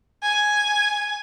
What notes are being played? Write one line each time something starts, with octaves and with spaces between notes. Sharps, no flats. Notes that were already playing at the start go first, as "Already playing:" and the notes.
G#5